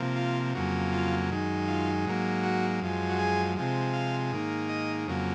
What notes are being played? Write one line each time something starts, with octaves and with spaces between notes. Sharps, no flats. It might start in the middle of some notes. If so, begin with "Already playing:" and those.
Already playing: C3 F3 A#3
F4
F2 C#3 F#3 A#3
F4
F#2 D#3 G#3
F4
G#2 F#3 A#3
F#4
F#2 F3 G#3
F#4
G#4
C3 F3 G#3
F5
G#2 D#3 A#3
D#5
F2 C#3 F#3 A#3